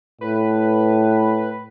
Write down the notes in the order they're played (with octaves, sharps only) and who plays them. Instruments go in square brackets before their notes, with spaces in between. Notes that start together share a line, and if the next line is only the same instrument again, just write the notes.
[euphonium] A2 [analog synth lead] B4